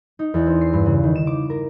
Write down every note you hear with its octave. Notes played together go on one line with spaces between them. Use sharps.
D#4
E2
C4
C7
G2
C#3
D#3
E7
D6
A#4